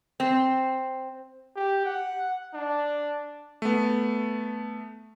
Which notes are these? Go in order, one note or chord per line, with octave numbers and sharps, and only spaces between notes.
C4
G4
F#5
D4
A3 B3